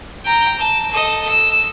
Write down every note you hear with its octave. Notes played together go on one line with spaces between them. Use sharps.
G5 A#5
A5
A4 D#5
E6